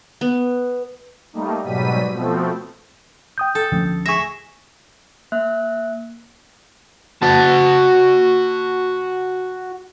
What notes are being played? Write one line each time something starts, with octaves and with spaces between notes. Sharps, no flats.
B3
G3 A3 A#3 D#4
G#2 B2 F#3 G3 B6 D#7
B2 F3 A3 C4
G5 D#6 G6
A4
D2 F3 C#4
G#4 E5 C#6 A#6
A#3 E5 F#6
F#4 A5